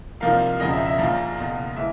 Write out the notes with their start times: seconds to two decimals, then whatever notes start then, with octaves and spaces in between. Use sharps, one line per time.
0.20 C2 C3 F3 A#3 D#4 F5
0.60 E1 E2 C#3 F3 D#5
0.73 E5
0.86 E5
0.99 A#1 G#2 F3 F5
1.38 F#1 E2 B2
1.76 E3 G#3 E5